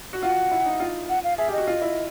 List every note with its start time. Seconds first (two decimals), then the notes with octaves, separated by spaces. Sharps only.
0.13 F#4
0.23 F4 F#5
0.51 E4
0.66 D#4
0.80 F4
1.09 F#5
1.24 F5
1.38 G#4 E5
1.48 G4 D#5
1.58 F#4
1.67 F4
1.81 E4